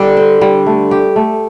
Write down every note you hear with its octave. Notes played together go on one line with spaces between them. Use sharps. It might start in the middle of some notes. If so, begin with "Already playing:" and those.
Already playing: D3 G3
C5
G3
A3
G4
A3